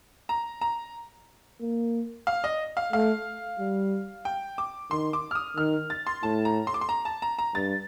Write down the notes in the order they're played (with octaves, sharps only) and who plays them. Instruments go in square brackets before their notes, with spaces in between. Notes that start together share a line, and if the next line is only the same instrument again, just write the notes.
[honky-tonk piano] A#5
A#5
[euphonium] A#3
[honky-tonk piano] F5
D#5
F5
[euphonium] A3 [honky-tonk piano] F5
[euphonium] G3
[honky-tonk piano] G5
D6
[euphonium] D#3 [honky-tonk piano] C6
[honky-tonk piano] D6
F6
D#6
[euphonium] D#3 [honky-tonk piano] F6
[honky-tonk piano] A6
C6
[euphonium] A2 [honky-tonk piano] A5
[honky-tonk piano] A#5
C6
D6
C6
A#5
A5
A#5
A#5
[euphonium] G2 [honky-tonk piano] A6